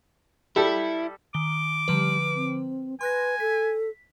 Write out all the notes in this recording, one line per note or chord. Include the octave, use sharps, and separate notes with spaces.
G3 E4 G4 A4
D#3 D6 G7
D3 F3 G3 B4
C4
B4 G#5 C6 F#6 A#6
A4 B6